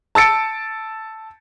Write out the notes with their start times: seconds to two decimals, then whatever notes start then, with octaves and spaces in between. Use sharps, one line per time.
0.15 A5 E6 A6 C#7 D7